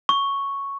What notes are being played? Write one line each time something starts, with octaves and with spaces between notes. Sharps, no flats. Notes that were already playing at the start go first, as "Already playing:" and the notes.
C#6